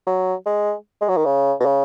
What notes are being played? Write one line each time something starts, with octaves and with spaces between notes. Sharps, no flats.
F#3
G#3
G#3
F#3
D#3
C#3
B2
C#3